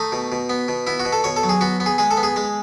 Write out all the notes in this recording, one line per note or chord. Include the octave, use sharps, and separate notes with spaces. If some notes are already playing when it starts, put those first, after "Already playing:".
Already playing: A3 D#4
B2
B2
B3
B2
B3 E4
F#4
B2
A4
B2 C#5
A4
F#3
G#4
B3 F#4
B3
G#4
G#3 G#4
A4
B3
G#4
G#3